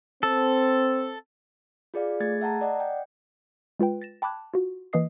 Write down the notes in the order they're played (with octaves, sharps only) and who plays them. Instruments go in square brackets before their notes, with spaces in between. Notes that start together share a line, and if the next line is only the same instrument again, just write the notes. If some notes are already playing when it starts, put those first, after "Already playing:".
[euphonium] C4 [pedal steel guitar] A4
[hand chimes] F4 G#4 D5 F5
A3 G#4 G#6 A6
E5 F#5 A5 A#5
D5 D#5 F#5
G5
[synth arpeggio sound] G#3 F4 B4 G5
A6 A#6 E7
G5 A5 B5 D6 F#6 G#6
F4 F#4
E3 A#3 B4 D#5 D#6 C7